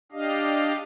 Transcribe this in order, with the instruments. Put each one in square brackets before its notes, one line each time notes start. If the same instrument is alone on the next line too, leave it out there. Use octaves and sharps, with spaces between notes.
[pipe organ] D4 G4 D#5 F5